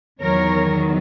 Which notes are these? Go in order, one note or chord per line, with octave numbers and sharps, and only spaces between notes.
E2 D#3 F#3 A#4 C#5